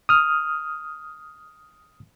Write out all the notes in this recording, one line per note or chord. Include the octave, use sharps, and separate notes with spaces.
D#6 F6